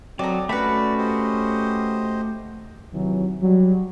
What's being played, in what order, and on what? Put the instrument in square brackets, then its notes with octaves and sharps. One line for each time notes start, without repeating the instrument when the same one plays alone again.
[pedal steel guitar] F#3 [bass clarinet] C4 [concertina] A4 D#5 [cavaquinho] D5 A#5
[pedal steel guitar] A3 F#4 [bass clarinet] C#4 [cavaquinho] B4 B5 [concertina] D5
[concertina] G4 C5 D#5
[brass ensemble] C3 D#3 E3 F#3
F#3 G3